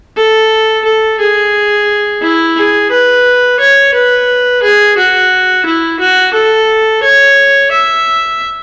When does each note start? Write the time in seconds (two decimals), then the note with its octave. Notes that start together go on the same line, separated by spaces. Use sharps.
0.17 A4
0.85 A4
1.19 G#4
2.22 E4
2.56 G#4
2.91 B4
3.60 C#5
3.94 B4
4.63 G#4
4.98 F#4
5.66 E4
5.99 F#4
6.34 A4
7.03 C#5
7.71 E5